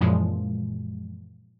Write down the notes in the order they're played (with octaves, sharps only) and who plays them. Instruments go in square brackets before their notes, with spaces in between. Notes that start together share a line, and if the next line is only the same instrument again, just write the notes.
[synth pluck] F#2 A#2 E3 F3 G#3